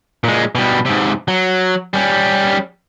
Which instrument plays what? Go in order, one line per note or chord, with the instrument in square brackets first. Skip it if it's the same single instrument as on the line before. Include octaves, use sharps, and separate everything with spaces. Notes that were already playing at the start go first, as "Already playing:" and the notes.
[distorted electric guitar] A#2 G#3
B2 G3
G#2 C3
F#3
G3 C#4